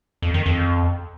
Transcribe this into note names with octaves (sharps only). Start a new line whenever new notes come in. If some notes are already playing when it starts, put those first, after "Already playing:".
F2
D#3
F2